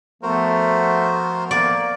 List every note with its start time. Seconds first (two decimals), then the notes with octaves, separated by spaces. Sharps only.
0.23 F3 A3 B3 F#4 A#4 C5
1.51 A#3 D5